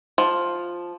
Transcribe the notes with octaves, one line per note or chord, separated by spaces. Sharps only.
F3